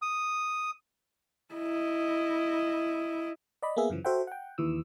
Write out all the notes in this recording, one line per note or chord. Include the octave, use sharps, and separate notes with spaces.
D#6
E4 D#5
D5 D#5 B5
A#3 B3 G#4 E5
F#2 C#3 E3 F3
F#4 A4 C5 E5 F#5 G5
F#5 G5
D#2 E3 E6